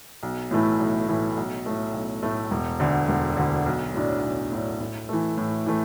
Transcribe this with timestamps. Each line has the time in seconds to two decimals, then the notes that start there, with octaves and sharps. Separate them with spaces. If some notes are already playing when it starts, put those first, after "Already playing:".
0.23 B1
0.51 A2 E3 A3 E4
0.80 B1
1.08 A2 E3 A3 E4
1.37 B1
1.66 A2 A3
1.94 B1
2.23 A2 A3
2.51 E1
2.80 D2 D3
3.09 E1
3.37 D2 D3
3.66 B1
3.94 A2 F#3 D4
4.23 B1
4.52 A2 F#3 D4
4.80 A2
5.09 E3 A3
5.37 A2
5.66 E3 A3